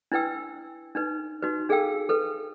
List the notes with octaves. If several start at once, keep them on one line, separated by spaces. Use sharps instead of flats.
D4 E4 B4 G5 E6
D4 D#4 B4
D#4 F#4 B4
D4 G#4 A4 F5 G5 E6
A4 B4